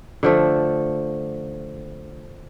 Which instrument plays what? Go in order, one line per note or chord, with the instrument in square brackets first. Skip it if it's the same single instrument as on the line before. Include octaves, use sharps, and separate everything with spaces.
[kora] D3 F3 A3